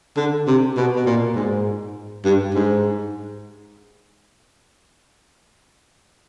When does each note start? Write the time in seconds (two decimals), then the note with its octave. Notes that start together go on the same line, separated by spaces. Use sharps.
0.17 D3
0.48 C3
0.77 B2
0.96 B2
1.06 A#2
1.35 G#2
2.25 G2
2.54 G#2